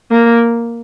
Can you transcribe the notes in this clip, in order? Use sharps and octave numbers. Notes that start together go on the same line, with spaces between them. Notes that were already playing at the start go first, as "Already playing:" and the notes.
A#3